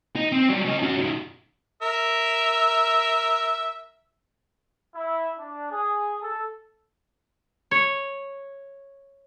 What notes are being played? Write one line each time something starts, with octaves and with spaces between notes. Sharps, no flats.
D#4
C4
F#3 G3
C#3 D#5
C#4 F#4
F#2 D#3
A#4 E5
E4
D4
G#4
A4
C#5